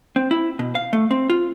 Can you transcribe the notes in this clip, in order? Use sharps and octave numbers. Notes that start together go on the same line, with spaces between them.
C4
E4
B2
F5
A3
C4
F4